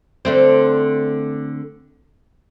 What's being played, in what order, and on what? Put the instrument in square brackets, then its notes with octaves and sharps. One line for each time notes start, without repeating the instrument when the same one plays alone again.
[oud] D3 A3 C4